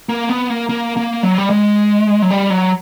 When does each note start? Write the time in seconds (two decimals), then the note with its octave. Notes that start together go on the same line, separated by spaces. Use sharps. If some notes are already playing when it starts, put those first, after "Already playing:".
0.09 A#3
0.29 B3
0.50 A#3
0.69 A#3
0.97 A#3
1.23 F#3
1.38 G3
1.50 G#3
2.22 F#3
2.30 G3
2.50 F#3